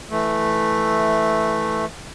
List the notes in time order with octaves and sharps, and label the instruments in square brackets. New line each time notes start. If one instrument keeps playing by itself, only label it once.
[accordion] E3 A3